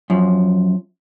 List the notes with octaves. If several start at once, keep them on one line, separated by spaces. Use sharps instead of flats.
F#2 F3